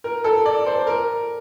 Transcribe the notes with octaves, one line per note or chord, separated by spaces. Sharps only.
A#4
A4
D5
C5
A#4